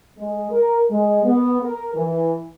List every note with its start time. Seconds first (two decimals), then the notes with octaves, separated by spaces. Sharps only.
0.18 G#3
0.51 A#4
0.90 G#3
1.24 B3
1.61 A#4
1.95 E3